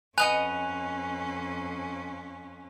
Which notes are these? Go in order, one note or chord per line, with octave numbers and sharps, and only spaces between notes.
F2 C#4 B4 D#5 F#5 G#5 F#6 F7